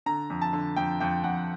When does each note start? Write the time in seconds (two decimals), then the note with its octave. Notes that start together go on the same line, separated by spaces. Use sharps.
0.06 D3 A#5
0.30 F2
0.41 A5
0.53 D3
0.76 F2 G5
1.00 F2 G5
1.24 F2 F#5